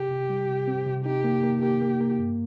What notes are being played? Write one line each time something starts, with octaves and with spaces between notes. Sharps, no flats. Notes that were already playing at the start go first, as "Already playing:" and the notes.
Already playing: C3 G4
C3
G3
C3
C4
C3
D#4 G4
A#3
A#3
A#3 G4
A#3
A#3
G2